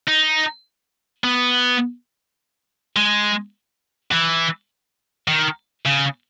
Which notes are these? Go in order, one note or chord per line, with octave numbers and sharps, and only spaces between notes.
D#4
B3
G#3
E3
D#3
C#3